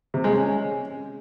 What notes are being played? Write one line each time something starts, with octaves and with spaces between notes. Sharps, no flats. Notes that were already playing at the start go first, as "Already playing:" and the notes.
C3
G#3
C#4